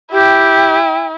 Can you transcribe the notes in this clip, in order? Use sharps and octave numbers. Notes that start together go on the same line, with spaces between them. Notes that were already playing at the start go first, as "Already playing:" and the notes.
E4 G4 G5